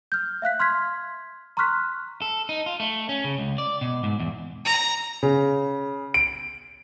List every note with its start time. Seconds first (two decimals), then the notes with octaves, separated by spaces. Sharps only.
0.12 F6 G6
0.42 E5 F5 F#6 B6
0.60 C6 F6 G#6 B6
1.57 A#5 C6 C#6 F6 F#6 B6
2.22 A4
2.49 D#4
2.66 F4
2.80 A3
3.09 C#4
3.24 C#3
3.38 C#2
3.58 D5
3.81 B2
4.04 G#2
4.20 E2
4.65 A#5
5.23 C#3
6.14 D7